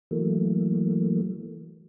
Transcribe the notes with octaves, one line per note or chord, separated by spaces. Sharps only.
E3 F#3 A3 A#3